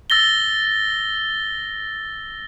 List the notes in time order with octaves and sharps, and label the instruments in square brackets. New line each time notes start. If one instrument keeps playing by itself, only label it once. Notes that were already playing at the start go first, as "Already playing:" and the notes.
[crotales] E6 A6 A#6 G7